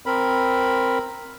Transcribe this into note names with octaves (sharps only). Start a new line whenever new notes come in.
C4 A#4 B5